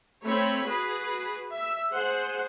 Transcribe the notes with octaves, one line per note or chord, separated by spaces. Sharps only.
A3 C4 C#5 B5
F#4 G#4 B4
E5
G#4 C5 F#5